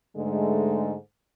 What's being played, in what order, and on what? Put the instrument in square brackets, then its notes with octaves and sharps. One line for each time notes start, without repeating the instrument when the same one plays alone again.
[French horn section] G#2 D3 G#3 A3